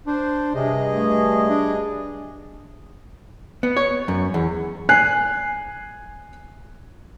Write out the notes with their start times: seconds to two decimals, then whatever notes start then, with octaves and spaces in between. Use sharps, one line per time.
0.07 D4 C5
0.55 G2 C3 G#4 D#5
0.92 A3
1.49 D4
3.63 B3
3.77 C#5
4.08 F#2
4.34 E2
4.89 G#5 F#6 C7